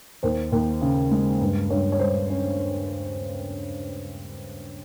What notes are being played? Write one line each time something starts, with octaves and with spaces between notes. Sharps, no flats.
D#2 C5
D#2
C#3
G#3
G2
G2 C#5
C#5
G3 C5
C#4